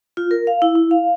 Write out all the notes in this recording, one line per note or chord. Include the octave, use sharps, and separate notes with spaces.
F4
A#4
F5
E4
E4
F5